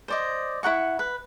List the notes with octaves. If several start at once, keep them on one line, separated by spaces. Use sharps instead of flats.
C5 D5 D#5
E4 A#4 F#5 C#6
B4